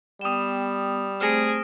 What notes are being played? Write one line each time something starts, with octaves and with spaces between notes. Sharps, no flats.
G3 B3 G5 D#6 E7
A3 C4 G#4 C5 F6 A#6 D7